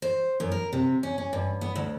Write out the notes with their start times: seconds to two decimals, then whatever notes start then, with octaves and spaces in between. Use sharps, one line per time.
0.02 C5
0.40 F#2
0.52 A#4
0.73 C3
1.03 C#4
1.18 C#4
1.33 G2
1.61 B3
1.76 D2